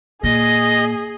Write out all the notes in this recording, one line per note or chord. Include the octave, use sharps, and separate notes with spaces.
A#2 G#4 D#5